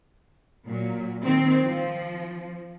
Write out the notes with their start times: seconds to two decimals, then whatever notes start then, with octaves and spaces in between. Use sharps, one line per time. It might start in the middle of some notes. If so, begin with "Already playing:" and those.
0.65 A#2 F#3
1.24 D#3 C4
1.63 F3